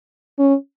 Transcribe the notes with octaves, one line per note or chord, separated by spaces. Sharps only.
C#4